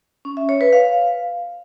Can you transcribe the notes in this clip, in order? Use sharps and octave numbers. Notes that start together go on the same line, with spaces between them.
C#4
E5
C#5
B4
F5